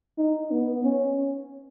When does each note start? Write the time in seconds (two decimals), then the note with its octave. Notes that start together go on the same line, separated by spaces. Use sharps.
0.18 D#4
0.51 B3
0.84 C#4